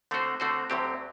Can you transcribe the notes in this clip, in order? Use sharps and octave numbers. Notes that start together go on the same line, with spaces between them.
D3 A3 C4 F#4 C5
D3 A3 C4 F#4 C5
D2 D3 F#3 C4 G4